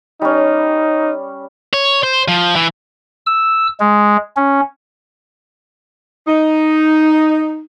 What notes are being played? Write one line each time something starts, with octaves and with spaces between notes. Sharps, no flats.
G3 C#4 D#4
C#5
C5
F3
E3
E6
G#3
C#4
D#4